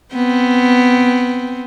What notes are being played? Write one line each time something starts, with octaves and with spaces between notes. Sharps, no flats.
B3 C4